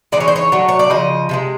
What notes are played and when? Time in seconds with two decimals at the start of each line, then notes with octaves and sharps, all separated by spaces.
0.12 E3 G#3 D#4 D5
0.20 C#5
0.28 C5
0.36 C#5
0.52 F#3 A3 D4
0.69 C#5
0.79 D5
0.90 C#3 F3 D#5
1.29 C3 E3 G#3